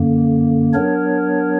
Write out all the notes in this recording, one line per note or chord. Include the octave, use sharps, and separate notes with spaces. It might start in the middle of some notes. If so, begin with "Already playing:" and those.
Already playing: F#2 D3 A#3
F#3 B3 D4 A#4 C#5